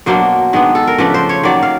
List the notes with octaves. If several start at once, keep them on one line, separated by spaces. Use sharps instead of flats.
B2 F#3 A#3 D4 C5
D#3 G#3 B3 D4
A4
A#4
C#3 F3 A3 D4 B4
C5
C#5
D#3 F#3 A#3 D5
F5